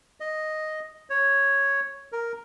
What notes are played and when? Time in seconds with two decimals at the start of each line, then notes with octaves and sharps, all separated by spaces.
0.20 D#5
1.10 C#5
2.12 A#4